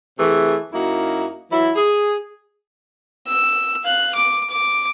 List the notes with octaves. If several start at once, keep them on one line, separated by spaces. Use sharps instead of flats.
C3 E3 A3 G#4
F#2 A#3 D#4 E4 F#4
E3 F#3 E4
G#4
E6
F5 F#6
D6
D6